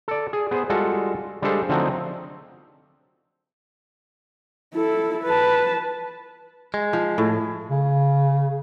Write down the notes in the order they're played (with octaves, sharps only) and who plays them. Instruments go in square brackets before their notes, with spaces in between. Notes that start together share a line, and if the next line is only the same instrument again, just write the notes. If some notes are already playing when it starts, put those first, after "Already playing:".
[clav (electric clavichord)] A4 D5
G#4
B3 G#4 C5
G3 G#3 F4 F#4 A4
G3 G#3 D4 A4 C5 F5
D3 F3 F#3 A3 C4 D#4
[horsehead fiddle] E4 A4
B4 A5
[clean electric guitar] G#3
[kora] F3
A2
[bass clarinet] C#3